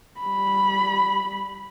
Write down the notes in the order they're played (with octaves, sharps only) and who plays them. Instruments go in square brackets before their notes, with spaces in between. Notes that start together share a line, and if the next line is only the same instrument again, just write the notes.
[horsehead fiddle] G3 B5